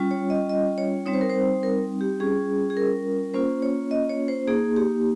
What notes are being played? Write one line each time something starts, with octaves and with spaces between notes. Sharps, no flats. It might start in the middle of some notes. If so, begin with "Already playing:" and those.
Already playing: G3 C#4 F4
C#5
D#5
D#5
C#5
G3 C4 D#4 C#5
C5
A#4
C5
A#4
G4
G3 C#4 F4 G#4
G#4
A#4
A#3 C#4 F4 C5
C#5
D#5
C#5
C5
A#3 D#4 G#4
G4